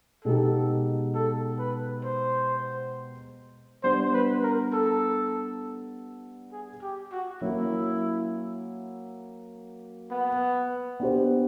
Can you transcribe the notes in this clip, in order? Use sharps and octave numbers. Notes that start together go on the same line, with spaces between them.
B2 G#3 B3 D#4 G4 A4
A4
B4
C5
G3 B3 D4 C5
B4
A#4
A4
G#4
G4
F#4
F#3 A#3 C#4 E4
B3
B3 D4 G4 C5